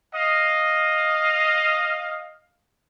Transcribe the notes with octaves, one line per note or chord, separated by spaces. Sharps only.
D#5 F5